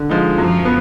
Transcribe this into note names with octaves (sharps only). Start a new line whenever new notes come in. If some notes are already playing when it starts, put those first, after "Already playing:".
Already playing: D3
F3 G#3 D#4
F#2 F3
B3